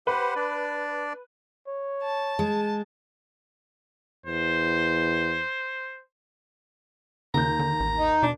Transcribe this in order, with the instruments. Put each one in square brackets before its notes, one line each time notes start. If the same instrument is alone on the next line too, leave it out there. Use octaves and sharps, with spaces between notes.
[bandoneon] G4 C5 F#5 [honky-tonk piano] B4
[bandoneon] D4 D5
[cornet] C#5
[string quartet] A5
[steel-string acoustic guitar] G#3
[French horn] E2 [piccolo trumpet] C5
[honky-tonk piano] D#2 G6 [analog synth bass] C#3 [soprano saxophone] A#5
[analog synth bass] D3
A1
[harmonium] D#4
[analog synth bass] B2 [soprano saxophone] D4